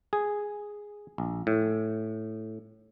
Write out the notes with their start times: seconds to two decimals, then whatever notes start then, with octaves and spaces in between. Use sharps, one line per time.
0.13 G#4
1.18 A#1
1.47 A2